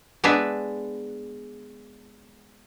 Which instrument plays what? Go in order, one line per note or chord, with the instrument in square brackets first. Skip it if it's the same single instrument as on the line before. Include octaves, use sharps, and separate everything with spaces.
[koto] G#3 B3 D4 G#4 B4 E5